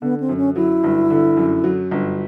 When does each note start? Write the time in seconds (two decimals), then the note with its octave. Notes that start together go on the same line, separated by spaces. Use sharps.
0.02 D3 B3
0.20 C4
0.29 F#2
0.37 C#4
0.56 F#3 E4
0.84 G1
1.10 D3
1.37 F#2
1.64 F#3
1.91 G1